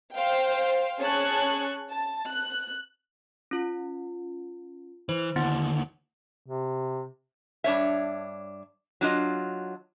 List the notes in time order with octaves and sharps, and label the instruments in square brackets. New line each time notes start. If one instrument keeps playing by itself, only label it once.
[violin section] C5 F5 G5
C#4 G#4 A5 C#6 F#6
A5
F#6
[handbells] C#4 F4
[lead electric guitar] E3 [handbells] C5
[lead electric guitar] D#2 D3 [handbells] B3 E4 F#5
[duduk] C3
[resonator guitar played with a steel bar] G2 D4 C#5 E5
F#3 D4 F4 D#5